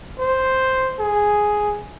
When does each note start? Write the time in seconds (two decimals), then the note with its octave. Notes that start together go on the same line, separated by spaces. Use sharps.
0.19 C5
1.00 G#4